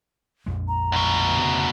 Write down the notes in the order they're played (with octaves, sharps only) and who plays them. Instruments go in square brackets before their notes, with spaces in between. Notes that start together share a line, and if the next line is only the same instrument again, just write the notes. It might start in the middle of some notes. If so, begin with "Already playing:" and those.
[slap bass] A#1 F2 G#3
[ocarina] A#5
[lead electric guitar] D2 B2
[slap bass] F2 C#3